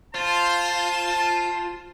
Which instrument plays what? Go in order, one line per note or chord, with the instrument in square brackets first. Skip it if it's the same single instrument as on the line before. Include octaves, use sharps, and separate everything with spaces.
[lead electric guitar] F4 [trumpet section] C5 A5